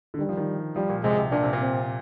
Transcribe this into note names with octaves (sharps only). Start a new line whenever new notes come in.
D3
D#3 G3
F3
D#3
F3 G3
A#2
C3 G#3
C3
A#2 D4
C3
A#2
C4